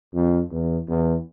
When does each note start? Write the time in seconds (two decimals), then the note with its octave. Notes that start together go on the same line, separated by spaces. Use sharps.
0.14 F2
0.51 E2
0.88 E2